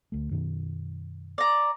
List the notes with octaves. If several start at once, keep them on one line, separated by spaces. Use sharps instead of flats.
D2 A3
F#2 B2 D#3
D5 A#5